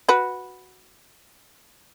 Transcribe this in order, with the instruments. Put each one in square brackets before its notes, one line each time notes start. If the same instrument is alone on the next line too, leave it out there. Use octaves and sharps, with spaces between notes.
[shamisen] F#4 B4